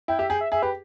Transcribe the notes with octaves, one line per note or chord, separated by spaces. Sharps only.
E4 G5
G4 E5
G#4 G5
E5
G#4 E5
G4 B4